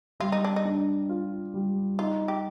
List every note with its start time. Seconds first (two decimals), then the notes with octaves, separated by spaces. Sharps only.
0.20 G3 F4
0.32 D#4
0.44 D4
0.56 D#4
0.65 D4
1.09 F4
1.54 G3
1.99 D#4 F4
2.28 G4